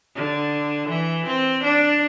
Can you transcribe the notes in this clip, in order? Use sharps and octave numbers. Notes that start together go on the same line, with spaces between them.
D3
E3
C4
D4